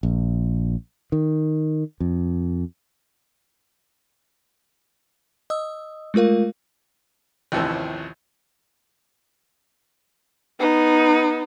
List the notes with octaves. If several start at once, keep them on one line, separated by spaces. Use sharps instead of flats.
A#1
D#3
F2
D#5 D#6 E6
G#3 A3 F4 A#4 F5
A1 D#2 C3 E3 F3 E6
B3 D#4